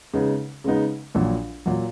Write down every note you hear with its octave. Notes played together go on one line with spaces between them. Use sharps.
C#3 G#3 B3 D#4
C#3 G#3 B3 D#4
A#1 A#2 F#3
A#2 F#3